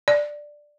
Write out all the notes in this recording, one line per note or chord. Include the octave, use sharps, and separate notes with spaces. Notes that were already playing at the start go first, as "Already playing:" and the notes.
D5